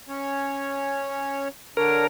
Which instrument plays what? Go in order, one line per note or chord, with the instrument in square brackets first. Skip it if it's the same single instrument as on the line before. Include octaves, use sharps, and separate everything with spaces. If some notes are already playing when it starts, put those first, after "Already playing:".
[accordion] C#4 C#5
[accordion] D3 D4 C#5 [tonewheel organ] A#4